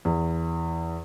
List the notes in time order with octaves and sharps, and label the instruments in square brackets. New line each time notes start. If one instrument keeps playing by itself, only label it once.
[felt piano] E2